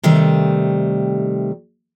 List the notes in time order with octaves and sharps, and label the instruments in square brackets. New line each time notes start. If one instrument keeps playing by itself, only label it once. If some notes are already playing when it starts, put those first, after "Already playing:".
[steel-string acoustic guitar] C3 D#3 G3 A3